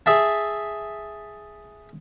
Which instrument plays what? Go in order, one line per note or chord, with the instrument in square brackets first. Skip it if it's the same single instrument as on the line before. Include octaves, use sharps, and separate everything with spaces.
[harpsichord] G#4 E5 A5